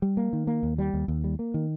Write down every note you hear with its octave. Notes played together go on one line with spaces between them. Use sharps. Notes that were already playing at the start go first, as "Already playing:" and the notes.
G3
A#3
D#3
A#3
D#2
G3
D#2
D#2
G3
A#3
D#3